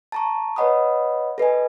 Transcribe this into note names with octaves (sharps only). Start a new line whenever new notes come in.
A5 A#5 C#6
B4 C#5 D#5 F#5 B5 D#6
A4 B4 D#5 G#5